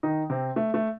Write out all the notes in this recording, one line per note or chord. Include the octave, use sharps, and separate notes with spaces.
D#3 D#4
C3 C4
A3
A3